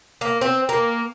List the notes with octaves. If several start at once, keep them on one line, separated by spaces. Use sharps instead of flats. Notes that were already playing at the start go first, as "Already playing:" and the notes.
A#3
C4
A#3